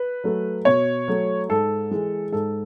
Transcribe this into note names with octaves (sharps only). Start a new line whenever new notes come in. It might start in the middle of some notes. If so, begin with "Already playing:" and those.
Already playing: B4
F#3 A3
B2 C#5
F#3 A3
G#2 A4
E3 G#3
G#2 A4